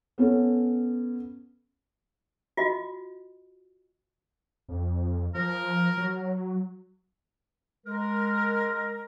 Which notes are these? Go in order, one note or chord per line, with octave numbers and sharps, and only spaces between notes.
B3 C#4 A4
F4 F#4 D#5
F2
F3 A#4
F#3
G#3 A#4